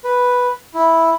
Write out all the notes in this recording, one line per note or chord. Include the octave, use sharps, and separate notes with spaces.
B4
E4